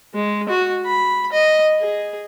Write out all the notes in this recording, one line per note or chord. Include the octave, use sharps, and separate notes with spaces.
G#3
F#4
B5
D#5
G#4